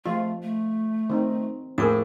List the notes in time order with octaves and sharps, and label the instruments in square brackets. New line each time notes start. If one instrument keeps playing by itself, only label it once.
[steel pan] F3 F4 [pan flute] A3 [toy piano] D#5
[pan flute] A3
[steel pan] D#3 C4 D#4
[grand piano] A2 [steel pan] F3 A#3 G#4 [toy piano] A#4 D6 D#6